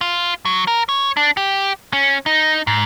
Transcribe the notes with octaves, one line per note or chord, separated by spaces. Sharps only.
F4
F#3
A#4
C#5
D4
G4
C#4
D#4
G#2